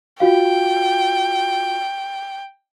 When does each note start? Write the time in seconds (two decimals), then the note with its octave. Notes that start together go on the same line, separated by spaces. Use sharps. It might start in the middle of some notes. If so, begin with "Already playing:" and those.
0.20 F4 F#4 F5 G5